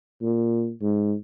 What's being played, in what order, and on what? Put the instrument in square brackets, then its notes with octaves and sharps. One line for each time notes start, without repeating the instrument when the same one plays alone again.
[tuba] A#2
G#2